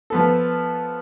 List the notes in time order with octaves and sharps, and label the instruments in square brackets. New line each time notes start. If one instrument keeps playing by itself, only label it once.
[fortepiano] F3 B3 A4